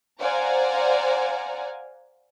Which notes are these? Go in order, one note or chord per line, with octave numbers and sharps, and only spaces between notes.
C5 D5 F5 F#5 G#5 A#5